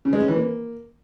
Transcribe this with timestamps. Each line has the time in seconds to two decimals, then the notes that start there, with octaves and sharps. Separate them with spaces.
0.05 C#3
0.13 G#3
0.21 C#4
0.28 E3
0.36 A#3